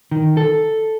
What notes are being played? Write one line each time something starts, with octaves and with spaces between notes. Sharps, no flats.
D#3
A4